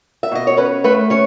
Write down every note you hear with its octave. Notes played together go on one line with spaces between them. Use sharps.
E5
B2 D#5
C#5
C#4 B4
A3 B4
C#4 C#5